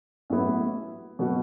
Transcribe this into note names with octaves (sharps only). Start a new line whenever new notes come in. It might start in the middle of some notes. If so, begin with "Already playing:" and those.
A1 A2 F#3 B3 E4
B2 F#3 B3 F#4